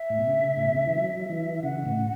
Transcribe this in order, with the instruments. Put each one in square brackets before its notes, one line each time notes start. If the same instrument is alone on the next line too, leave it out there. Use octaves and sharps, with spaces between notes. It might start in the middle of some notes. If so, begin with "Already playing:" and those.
Already playing: [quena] E5
[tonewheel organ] A2
B2
C#3
A2
B2
C#3
E3
F#3
E3
[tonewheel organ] C#3 [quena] F#5
[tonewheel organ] A2